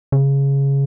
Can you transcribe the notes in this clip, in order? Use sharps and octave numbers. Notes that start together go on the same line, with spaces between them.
C#3